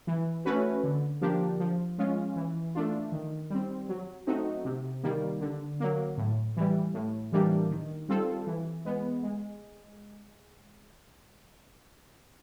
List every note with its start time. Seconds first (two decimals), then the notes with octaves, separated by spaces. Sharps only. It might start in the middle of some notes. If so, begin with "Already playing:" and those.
0.07 E3
0.45 A3 C#4 F#4 B4
0.84 D3
1.21 F3 A#3 D4 G4
1.60 F3
1.98 G#3 C#4 F4
2.36 E3
2.75 A3 D4 F4
3.12 D#3
3.50 G3 C4
3.89 F#3
4.27 A3 C4 D#4 F#4
4.65 C3
5.03 D#3 G3 A#3
5.41 D3
5.80 F#3 A#3
6.18 A2
6.57 E3 G3
6.94 A2
7.32 E3 G3 A#3 D4
7.70 D#3
8.09 G3 C4 F4 A4
8.47 E3
8.85 G#3 B3
9.23 G#3